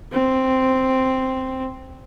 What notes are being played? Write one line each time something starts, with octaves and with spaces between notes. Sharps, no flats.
C4